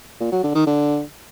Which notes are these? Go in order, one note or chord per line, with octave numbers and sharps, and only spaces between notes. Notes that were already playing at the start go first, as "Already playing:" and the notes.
A#2
F#3
D3
D#3
D3